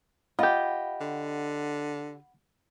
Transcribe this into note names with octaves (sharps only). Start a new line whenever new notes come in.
F4 G4 D#5 F#5 B5
D3